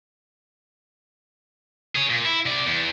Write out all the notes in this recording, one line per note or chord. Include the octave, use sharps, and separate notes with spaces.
G#4 C#5
A#2
E4
C3 D5
E2